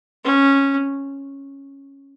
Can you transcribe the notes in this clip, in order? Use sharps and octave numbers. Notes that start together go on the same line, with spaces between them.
C#4